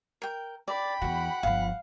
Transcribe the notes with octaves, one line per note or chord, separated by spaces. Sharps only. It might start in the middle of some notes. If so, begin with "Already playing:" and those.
A#4 G5
D5 G5 B5
E2 E3 F#4 F#5
G1 F3 F5